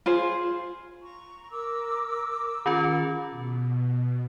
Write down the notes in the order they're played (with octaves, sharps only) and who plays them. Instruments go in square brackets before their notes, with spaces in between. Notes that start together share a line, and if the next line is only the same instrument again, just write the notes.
[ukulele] F4 G#4 C5
[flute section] A#5 C#6
A#4 D6 E6
[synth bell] D#3 C#4 F4
[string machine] B2